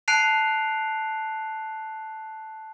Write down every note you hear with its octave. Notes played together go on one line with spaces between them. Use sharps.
A5 F#6 C7 D7 F7